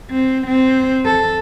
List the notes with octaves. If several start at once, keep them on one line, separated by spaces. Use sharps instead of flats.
C4
C4
A4